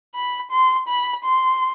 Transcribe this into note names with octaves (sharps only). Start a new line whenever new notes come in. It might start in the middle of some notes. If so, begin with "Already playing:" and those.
B5
C6
B5
C6